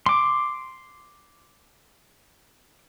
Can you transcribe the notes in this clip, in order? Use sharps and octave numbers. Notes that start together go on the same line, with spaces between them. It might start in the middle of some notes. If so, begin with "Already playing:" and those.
C6 D6